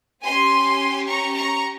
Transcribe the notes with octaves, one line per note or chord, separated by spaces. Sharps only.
C#4 G4 G#5 C6
A#5 C#6
A#5 C#6